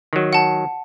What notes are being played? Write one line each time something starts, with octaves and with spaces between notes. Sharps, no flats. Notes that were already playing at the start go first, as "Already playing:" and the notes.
D#3 F#3
F#5 A5